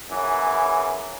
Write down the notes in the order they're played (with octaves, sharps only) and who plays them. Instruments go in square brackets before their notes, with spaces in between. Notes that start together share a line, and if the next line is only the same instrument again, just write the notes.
[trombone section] F#2 C#3 E3